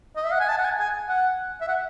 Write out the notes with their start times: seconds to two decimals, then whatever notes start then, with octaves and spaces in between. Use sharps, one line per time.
0.16 D#5
0.24 E5
0.32 F#5
0.40 G#5
0.49 A5
0.58 F#5
0.64 G#5
0.79 G#5
1.09 F#5
1.61 E5
1.68 F#5